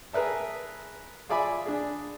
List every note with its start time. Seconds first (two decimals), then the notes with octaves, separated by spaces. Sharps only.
0.13 G#4 A#4 B4 E5 A5
1.29 F4 G#4 D5 E5 G#5 B5
1.66 D4 G#4